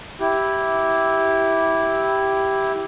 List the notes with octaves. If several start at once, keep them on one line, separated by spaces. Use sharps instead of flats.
E4 G4